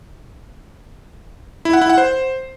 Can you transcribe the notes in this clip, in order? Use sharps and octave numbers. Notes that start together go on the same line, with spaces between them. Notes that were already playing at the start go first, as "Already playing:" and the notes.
E4
F#5
E4
F#5
C5